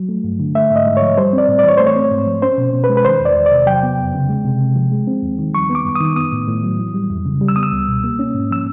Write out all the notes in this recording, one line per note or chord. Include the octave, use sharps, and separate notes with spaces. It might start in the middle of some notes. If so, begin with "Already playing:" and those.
Already playing: F#3
A3
G2
D3
A3 E5
G#2
D#5
G#2
C#5
F3
G3 C5
C4
D5
A2
D5
E3 C#5
A3 C5
C#5
C4
G#2
F3
C#4 C5
B2
B2
B4
G#3
B4
D#3 C5
E2
D5
E2
D5
C3
F#3 G5
B3
F2
C#3
G#3
C3
C3
F3
G#3
C4
D#2
D#3
G3 C#6
B3
D6
F#2
D#6
D#3
B3 D#6
A2
A2
F#3
E3
G3
F2
C#3
G3
E6
B3 D#6
E6
C#2
B2
A#3
C#4
G#2
F3 E6